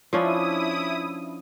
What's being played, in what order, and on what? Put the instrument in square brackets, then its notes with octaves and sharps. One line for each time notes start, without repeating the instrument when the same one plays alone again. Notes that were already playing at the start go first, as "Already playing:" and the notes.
[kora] F3 C#4 D4 [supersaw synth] E4 D#6